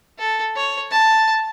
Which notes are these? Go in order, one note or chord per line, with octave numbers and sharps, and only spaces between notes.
A4
C#5
A5